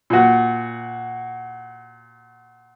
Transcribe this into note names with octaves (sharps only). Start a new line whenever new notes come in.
A#2 F#4